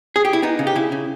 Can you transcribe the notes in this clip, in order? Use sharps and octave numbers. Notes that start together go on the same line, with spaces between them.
G#4
G4
E4
B3 D#4
C#3
G4
C#3 E4
C#3